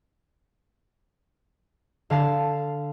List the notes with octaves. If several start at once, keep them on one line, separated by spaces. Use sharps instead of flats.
D3 F5 A5 C7